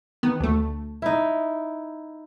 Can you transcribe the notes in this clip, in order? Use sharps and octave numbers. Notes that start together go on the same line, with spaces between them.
D#3 B3
D2 A3
D#4 E4